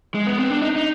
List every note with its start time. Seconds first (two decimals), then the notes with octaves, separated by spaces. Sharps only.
0.15 G#3
0.27 B3
0.38 C4
0.50 D4
0.62 D#4
0.76 D#4